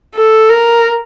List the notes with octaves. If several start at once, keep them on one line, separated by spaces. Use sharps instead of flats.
A4
A#4